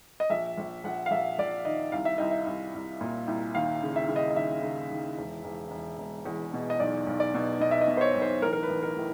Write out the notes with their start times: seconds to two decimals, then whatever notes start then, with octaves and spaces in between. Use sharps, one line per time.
0.20 D#5
0.30 A#1 E5
0.58 A#1
0.84 A#1 F#5
1.06 F5
1.11 A#1 E5
1.38 A#1 D5
1.65 D#3 D#5
1.92 C2 F5
2.05 E5
2.18 C2 D#5
2.31 E5
2.47 C2
2.74 C2
3.01 A#2
3.27 C2
3.55 D#2 F5
3.82 C#3
3.96 E5
4.08 C#3
4.16 D#5
4.30 D#5
4.36 D#2 E5
4.63 C#3
4.91 D#2
5.18 E1
5.44 E1
5.71 E1
5.98 E1
6.25 E2
6.53 B2
6.70 D#5
6.80 B1 D5
7.07 B1
7.20 D5
7.34 B2
7.60 B2 D#5
7.71 E5
7.81 D#5
7.87 B2
7.97 C5
8.01 C#5
8.15 B1
8.22 C5
8.42 A1 A#4
8.53 A#4
8.63 B4
8.69 A1
8.83 A#4
8.96 A2